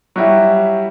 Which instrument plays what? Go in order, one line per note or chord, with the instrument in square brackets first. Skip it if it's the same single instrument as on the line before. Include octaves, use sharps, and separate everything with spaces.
[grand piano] F#3 G3 E4 G4